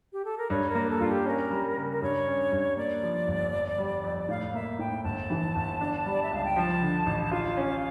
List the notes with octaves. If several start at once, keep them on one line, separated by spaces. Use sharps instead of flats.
G4
A4
A#4
G2 C#5
A#4
A#3
A4
G2 F4
G4
C#4 A#4
G3
C#3
A#4
G2 C#5
C#4
G2
A#3 D5
F3
G1
F2
G3
F2
A2 F5
A#3 E5
A2 G5
G1 A5
E3
G1
D4
G3 D5
E5
C#2 F5
G5
F3 A5
D3
A1
F4 F5
C#4